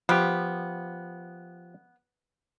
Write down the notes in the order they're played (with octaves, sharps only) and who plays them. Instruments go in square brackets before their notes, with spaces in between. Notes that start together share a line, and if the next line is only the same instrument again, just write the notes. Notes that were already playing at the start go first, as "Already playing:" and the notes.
[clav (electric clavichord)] F3 G4 [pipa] B3